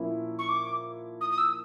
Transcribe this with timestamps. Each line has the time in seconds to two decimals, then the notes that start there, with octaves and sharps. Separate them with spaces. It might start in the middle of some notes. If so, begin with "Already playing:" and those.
Already playing: A#2 F3 A#3 C#4 E4
0.39 C#6
0.49 D6
1.21 D#6
1.31 D#6
1.38 E6